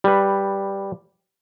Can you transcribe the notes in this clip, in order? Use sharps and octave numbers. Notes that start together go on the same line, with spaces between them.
G3 B4